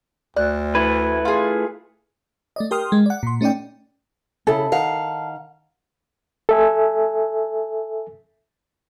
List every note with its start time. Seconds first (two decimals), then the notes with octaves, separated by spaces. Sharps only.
0.37 D2 D5 F#6
0.75 A3 E4 B4 G#6
1.25 F4 G#4
2.56 A3 D5 D#5
2.71 G4 A#4 G5 C6 D#6 F6
2.92 G#3
3.06 D5 F#5
3.23 A#2 C6
3.41 A3 C#4 D#4 D5 G5
4.47 C#3 E4 A4
4.72 D#3 F5 F#5
6.49 A4 E5 G#5